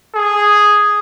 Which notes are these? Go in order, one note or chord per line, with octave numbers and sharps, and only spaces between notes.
G#4